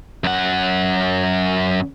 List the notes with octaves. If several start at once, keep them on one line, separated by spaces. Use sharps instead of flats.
F#2 F#5